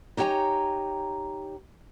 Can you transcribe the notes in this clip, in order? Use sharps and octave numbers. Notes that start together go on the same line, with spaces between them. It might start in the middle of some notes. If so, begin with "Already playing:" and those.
D#4 G4 C#5 G5 G#5 A#5